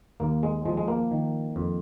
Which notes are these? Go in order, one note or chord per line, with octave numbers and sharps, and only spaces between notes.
D#2 A#3
G#3
F3 G#3
G#3
A#3
D#3
F2